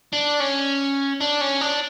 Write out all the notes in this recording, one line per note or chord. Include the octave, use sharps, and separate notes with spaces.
D4
C#4
D4
C#4
D4